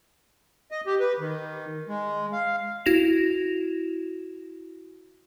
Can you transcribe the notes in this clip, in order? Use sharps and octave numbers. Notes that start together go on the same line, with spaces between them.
D#5
G4
B4
D#3
G#3
F5
E4 F#4 A#6 E7 F7